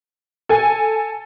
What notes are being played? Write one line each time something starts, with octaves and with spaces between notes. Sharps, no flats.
A4 G#5